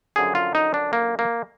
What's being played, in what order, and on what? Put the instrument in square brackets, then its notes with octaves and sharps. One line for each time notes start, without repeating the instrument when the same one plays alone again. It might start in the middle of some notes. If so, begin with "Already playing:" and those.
[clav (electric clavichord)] F#2 D3 F3 G#4
F4
D#4
D4
A#3
A#3